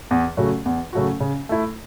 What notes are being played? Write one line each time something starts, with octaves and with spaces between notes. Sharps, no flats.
E2
C#3 F#3 A3 F#4
E2
C#3 F#3 A3 F#4
C#3
A3 E4